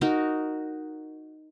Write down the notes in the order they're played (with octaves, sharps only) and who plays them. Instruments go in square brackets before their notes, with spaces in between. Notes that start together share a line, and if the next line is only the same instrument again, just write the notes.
[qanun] D#4 F#4 A#4